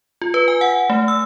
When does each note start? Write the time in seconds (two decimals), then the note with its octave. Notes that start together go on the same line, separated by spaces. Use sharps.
0.22 F4
0.34 B4
0.48 G#5
0.61 F#5
0.90 A3
1.08 E6